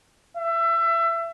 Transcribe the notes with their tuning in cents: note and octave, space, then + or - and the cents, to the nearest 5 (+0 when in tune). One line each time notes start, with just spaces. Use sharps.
E5 +25